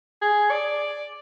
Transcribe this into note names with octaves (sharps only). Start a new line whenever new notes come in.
G#4
D5